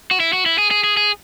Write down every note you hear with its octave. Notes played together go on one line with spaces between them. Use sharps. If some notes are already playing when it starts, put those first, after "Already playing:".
F#4
E4
F#4
E4
G#4
G#4
G#4
G#4